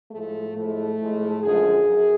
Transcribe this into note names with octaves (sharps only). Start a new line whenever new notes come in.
A2 F3 G#3 A3
A2 F3 G#3 A3
A2 F3 G#3
F#2 D3 F3 G#3 G#4
F#2